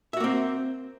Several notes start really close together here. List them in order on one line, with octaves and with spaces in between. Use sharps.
E5 F#4 A#3 C4